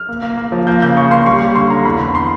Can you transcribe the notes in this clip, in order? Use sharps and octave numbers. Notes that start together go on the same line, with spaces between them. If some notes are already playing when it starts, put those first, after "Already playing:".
Already playing: F6
A#3
A#3
A#3
F3
A#3 G6
C#3 G6
C#3 C#6
A#3 C6
G3 C#6
G3 C#6
D3 C6
D3 A#5
E2 B5
E2
C6